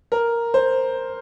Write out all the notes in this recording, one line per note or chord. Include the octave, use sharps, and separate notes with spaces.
A#4
C5